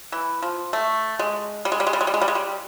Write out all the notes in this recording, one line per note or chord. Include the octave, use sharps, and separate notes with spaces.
E3
F3
A3
G#3
G3
G#3
G3
G#3
G3
G#3
G3
G#3
G3
G#3
G3